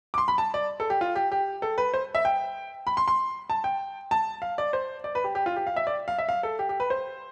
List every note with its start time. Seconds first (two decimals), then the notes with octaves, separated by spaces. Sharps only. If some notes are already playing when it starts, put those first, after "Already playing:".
0.14 D6
0.18 C6
0.28 B5
0.38 A5
0.54 D5
0.80 A4
0.90 G4
1.01 F4
1.16 G4
1.32 G4
1.62 A4
1.78 B4
1.94 C5
2.15 E5
2.25 G5
2.87 B5
2.97 C6
3.08 C6
3.50 A5
3.64 G5
4.11 A5
4.42 F5
4.58 D5
4.73 C5
5.04 D5
5.15 B4
5.24 G4
5.35 G4
5.46 F4
5.56 G4
5.67 F5
5.76 E5
5.87 D5
6.08 F5
6.18 E5
6.29 F5
6.43 A4
6.59 G4
6.69 G4
6.80 B4
6.90 C5